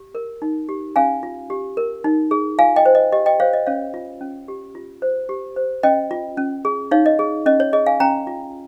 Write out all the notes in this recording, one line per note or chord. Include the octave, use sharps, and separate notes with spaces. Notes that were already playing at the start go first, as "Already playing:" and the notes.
Already playing: G4
A#4
D#4
G4
C#4 F5 G#5
F4
G4
A#4
D#4
G#4
F4 F5 G#5
D#5 G5
C5
D#5
G4 D#5
D#5 G5
C5 C#5 F5
D#5
C#4 C#5 F5
F4
C#4
G4
F4
C5
G4
C5
C#4 D#5 G5
F4
C#4
G#4
D#4 C#5 F5
D#5
G#4
C#4 D#5
C#5
G#4 D#5
F5 G#5
C#4 G5 A#5
F4